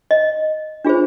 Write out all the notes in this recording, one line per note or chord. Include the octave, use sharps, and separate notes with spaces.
D#5
D4 F4 G#4 C5